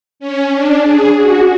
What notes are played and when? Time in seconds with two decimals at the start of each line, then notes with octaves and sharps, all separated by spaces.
0.20 C#4
0.52 D4
0.84 G#4
1.16 F#4